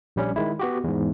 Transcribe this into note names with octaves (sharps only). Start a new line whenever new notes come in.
A#1 G3 C#4
D#3 G#3 E4
B3 F#4 G4
E2 G#2